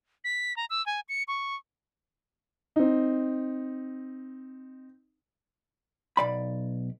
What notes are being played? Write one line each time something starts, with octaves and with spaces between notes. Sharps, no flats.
B6
A#5
E6
G#5
C#7
C#6
C4 D#4
B1 D5 B5